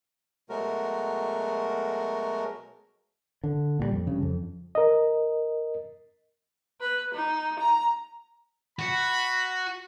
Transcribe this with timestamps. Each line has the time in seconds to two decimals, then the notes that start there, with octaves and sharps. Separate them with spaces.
0.50 B2 F#3 G#3 A3 F#4 A#4
3.44 D3
3.79 A#2 D3 G3
3.93 F2
4.07 G2 C#3
4.22 F2
4.75 A#4 D#5
6.81 B4
7.13 D#4
7.58 A#5
8.79 F#4 B5